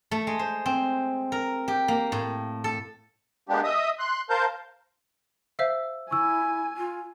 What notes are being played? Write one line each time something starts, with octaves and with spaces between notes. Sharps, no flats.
A3
G#3
C5
C4
A#4
G4
A#3
A2
A4
G#3 A#3 B3 D4 G4
D#5 E5 D#6
C6 F#6
A#4 C5 F5 A5 G6
C5 E5 F5 E6
E4 G#5 C#6 E6
F4